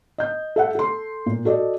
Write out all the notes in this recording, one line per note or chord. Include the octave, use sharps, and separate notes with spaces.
D#5 G6
A4 E5 F#5
A4 C6
A#2
F#4 A4 D5 D#5